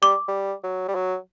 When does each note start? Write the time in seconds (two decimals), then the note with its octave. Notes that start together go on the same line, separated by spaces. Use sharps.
0.02 G3 D6
0.28 G3
0.63 F#3
0.88 G3
0.95 F#3